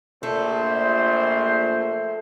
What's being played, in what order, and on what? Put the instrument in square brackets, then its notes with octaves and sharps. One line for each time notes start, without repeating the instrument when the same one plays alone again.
[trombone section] A#1 [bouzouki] A3 [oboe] C5